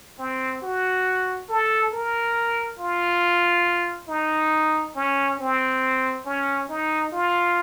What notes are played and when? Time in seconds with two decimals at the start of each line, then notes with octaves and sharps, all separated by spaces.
0.19 C4
0.62 F#4
1.49 A4
1.92 A#4
2.79 F4
4.08 D#4
4.96 C#4
5.39 C4
6.25 C#4
6.68 D#4
7.12 F4